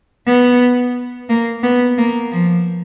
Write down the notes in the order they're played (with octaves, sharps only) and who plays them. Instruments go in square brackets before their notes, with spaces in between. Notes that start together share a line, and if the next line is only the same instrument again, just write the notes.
[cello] B3
A#3
B3
A#3
F3